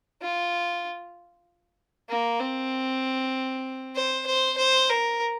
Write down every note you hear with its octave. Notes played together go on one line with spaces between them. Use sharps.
F4
A#3
C4
C5
C5
C5
A#4